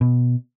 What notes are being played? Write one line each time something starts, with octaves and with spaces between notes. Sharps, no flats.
B2